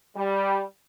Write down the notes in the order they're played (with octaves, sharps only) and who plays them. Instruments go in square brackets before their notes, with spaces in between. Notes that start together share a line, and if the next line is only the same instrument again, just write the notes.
[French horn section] G3